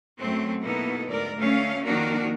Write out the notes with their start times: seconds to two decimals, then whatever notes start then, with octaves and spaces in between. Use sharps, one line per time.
0.18 F#2 F#3 A3 C4
0.62 B2 A#3 B3 D#4 E4 A4
1.07 D2 G#2 A#4 D5
1.37 D2 A3 C#4 F5
1.85 F2 D#3 A#3 D4 F#4 A#4